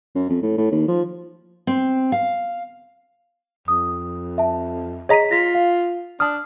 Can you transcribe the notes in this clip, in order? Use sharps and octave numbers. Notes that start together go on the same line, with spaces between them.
F#2
F2
A2
A2
D#2
F3
C4
F5
F2 D#6
E5 A5
G#4 C#5 D#5 A#5 B6 D#7
F4 A#6 B6
F5
D4 A5 D#6 F6